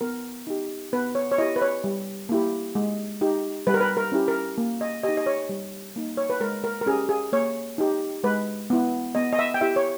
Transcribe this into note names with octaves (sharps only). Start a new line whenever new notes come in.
B3 A#4
D#4 G4
B3 B4
C#5
C#5
E4 G4 D#5
B4
C#5
G3
A#3 E4 G4
G#3
D#4 G4
G3 B4
A#4
B4
A#4
C#4 E4 G4
A#4
A#3
D#5
D#4 G4 D#5
D#5
C#5
G3
A#3 D#4
C#5
B4
G#3 A#4
A#4
A#4
C#4 G4 G#4
G#4
A#3 C#5
D#4 G4
G#3 B4
B3 E4
B3 D#5
D#5
E5
G5
E4 G4 E5
C#5